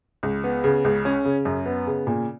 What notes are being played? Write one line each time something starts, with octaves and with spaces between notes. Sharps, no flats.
C#2
B3
C#3
C#2
C#4
C#3
F#2
B3
C#3
A#2